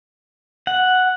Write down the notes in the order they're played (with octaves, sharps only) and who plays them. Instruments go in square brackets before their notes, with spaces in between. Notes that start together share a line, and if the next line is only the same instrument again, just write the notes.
[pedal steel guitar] F#5